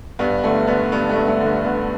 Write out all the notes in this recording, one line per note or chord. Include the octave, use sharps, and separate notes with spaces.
G2 B3
D3 A3
D3 B3
G2 B3
A3
G2
A3
D3
B3
D3 B3